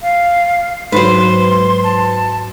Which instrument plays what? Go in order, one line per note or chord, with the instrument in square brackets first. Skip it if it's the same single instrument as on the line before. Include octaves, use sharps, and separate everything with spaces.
[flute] F5
[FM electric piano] G#2 F#3 [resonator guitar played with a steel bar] B4 C5 [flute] C6
[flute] A5